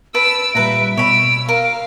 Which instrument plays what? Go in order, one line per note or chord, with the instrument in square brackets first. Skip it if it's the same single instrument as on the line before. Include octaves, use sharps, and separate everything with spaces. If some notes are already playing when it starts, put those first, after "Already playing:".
[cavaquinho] B4 A5 B5 [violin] E6 [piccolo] D7
[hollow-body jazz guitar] A#2 G3 [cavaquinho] B4 A#5 [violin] E5
[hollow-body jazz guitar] B2 [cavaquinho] C#5 B5 [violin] E6 [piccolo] D7
[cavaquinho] A#4 [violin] F5 [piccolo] D7